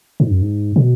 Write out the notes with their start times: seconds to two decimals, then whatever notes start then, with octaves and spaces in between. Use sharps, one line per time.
0.20 G#2
0.31 F#2
0.42 G#2
0.76 B2